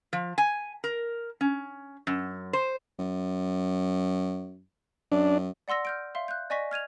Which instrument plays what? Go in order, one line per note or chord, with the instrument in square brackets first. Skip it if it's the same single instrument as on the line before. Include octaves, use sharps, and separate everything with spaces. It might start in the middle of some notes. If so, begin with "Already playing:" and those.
[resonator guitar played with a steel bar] F3
G#5
A#4
C#4
F#2
C5
[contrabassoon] F#2
[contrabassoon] F#2 [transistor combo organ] D4
[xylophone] D5 F#5 C6 E6 A#6
F6 G6 D7
E5 F5 C6
F#6 G6
D5 D#5 G#5 C#6 A#6 B6
F6 G#6 D#7 F7